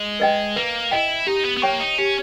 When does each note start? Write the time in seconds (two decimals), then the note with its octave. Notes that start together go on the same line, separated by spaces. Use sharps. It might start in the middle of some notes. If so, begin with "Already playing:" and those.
Already playing: G#3
0.20 B4 D#5 G5
0.56 A#3 B4
0.91 E4 D#5 G5
1.27 D#4 G4
1.45 B3
1.57 B3
1.62 A#3 C#5 G5 C#6
1.80 D#4
1.98 C#4 G4